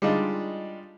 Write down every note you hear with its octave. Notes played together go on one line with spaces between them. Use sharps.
G3 G#3 D4 D#4 F4